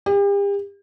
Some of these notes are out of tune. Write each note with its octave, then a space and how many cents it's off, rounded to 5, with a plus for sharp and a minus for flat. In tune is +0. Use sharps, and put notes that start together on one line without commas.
G4 +40